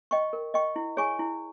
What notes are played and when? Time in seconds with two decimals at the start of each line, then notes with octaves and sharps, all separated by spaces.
0.11 D#5 G5 C#6
0.33 A#4
0.54 D#5 G5 C#6
0.76 E4
0.97 G#4 C#5 G#5 C#6
1.19 E4